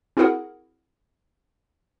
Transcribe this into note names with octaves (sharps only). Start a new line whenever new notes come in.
C4 E4 F#4 G#4 A#4 F#5